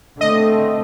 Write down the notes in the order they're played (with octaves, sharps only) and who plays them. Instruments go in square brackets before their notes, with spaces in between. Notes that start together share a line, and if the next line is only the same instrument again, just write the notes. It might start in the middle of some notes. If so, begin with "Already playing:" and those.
[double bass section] D3 A3 C4 [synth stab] D#5